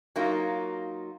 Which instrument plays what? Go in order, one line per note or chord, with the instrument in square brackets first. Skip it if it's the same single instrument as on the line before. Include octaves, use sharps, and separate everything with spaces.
[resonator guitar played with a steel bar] F#3 A#3 D#4 F4